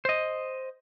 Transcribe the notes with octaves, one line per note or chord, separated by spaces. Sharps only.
C5 D#5